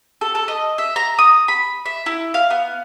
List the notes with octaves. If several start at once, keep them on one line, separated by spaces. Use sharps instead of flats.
A4
A4
D#5
E5
A#5
D#6
B5
E5
E4
F5
B3